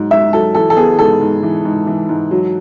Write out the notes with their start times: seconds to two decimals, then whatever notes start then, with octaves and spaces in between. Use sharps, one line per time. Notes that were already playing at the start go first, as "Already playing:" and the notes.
Already playing: G#2 F#3
0.11 G#2 E5
0.32 F#3 A4
0.55 E3 A4
0.70 A4
0.77 B3 G#4
0.99 G#2 A4
1.21 G#2
1.43 E3
1.65 G#2
1.87 E3
2.09 G#2
2.31 F#3